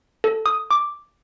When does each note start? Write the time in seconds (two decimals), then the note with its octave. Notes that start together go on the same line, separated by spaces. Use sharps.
0.24 A4
0.46 D#6
0.71 D6